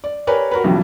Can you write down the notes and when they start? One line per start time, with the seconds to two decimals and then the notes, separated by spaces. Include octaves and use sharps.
0.04 D5
0.27 G4 A#4 B4 C#5 D5 G#5
0.51 F#4 A#4 B4
0.64 B1 C#3 E3 F3 G3